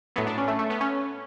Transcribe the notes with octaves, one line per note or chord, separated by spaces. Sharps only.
A2 F#3 B3
D4
C#4
A3
A3
B3
C#4